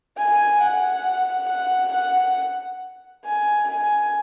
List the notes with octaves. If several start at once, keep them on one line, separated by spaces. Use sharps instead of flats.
G#5
F#5
F#5
F#5
G#5
G#5